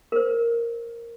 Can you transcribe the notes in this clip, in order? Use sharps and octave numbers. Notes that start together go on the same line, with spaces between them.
A#4 C5